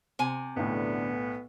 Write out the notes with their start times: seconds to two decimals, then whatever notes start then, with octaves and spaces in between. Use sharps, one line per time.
0.19 C3 G#5
0.57 B1 E2 A2 D3 B3